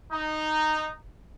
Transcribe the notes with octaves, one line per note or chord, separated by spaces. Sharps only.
D#4